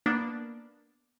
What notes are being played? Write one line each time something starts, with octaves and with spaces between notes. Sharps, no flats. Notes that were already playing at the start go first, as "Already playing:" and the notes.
A#3 B3 D4